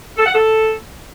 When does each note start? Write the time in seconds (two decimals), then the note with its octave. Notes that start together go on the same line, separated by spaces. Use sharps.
0.17 A4
0.25 F#5
0.34 A4